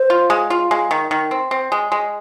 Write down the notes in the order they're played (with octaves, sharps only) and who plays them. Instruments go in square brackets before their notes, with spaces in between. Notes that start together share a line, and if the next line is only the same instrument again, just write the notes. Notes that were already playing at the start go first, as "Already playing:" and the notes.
Already playing: [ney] C5
[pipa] F4
G#3
F4
G#3
D#3
D#3
C4
C4
G#3
G#3